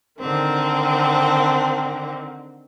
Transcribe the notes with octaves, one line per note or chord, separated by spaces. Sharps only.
D3 D#3 C4